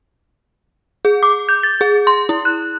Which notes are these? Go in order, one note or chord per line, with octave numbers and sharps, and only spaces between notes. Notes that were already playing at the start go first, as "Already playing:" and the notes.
G#4
D6
G6
A6
G#4
C6
E4
F#6